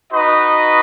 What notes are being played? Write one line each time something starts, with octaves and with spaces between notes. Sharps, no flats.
D#4 F#4 B4 D#5